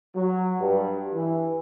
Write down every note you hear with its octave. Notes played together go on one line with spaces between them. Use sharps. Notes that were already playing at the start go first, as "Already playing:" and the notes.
F#3
G2
E3